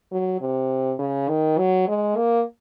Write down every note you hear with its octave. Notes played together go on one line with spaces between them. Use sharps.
F#3
C3
C#3
D#3
F#3
G#3
A#3